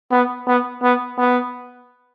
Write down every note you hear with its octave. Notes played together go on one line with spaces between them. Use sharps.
B3
B3
B3
B3